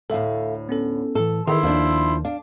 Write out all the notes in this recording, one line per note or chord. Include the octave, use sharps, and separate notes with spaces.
D2 A2 A4 E5 F5
B3 C#4 A4
A2 E3 A4
D#3 E3 E4 G#4 E5 C6
D#2 F3 D4
D4 F5